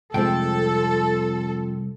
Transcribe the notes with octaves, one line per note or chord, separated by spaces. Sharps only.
C2 F2 C3 G#3 C4 F4 A4 G5